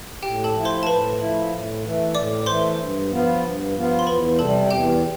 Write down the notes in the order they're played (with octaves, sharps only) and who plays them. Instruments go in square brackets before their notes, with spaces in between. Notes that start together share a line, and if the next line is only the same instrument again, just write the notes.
[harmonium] A2 [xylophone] G4 G5
[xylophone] A4 A5
[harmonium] F3 A3 E4
[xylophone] C5 C6
A5
[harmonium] A2 [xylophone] B4 B5
[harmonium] F3 A3 E4
A2
E3 A3
[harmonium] A2 [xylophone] D5 D6
[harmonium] E3 A3 [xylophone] C5 C6
[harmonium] G2
F3 B3 F4
G2
F3 B3 F4
[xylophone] C6
[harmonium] E2 [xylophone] B4 B5
[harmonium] C3 G3 [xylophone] A4 A5
[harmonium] E2 [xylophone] G4 G5